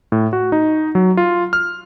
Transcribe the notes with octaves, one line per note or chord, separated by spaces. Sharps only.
A2
F#4
D#4
F#3
F4
F6